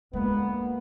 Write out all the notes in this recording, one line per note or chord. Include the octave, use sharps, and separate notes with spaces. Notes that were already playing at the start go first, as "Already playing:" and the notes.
D2 D3 G#3 A#3 B3